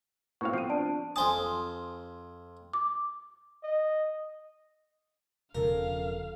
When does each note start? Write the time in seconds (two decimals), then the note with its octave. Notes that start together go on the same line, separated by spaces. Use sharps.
0.41 A2 B3 C4 F#4 F5 C#6
0.53 F3 C7 D#7
0.70 D4 D5 A5 D7
1.16 F2 C5 G#5 A5 D#6
2.73 D6
3.63 D#5
5.55 E1 C#3 F3 G4 A4 A#4 F5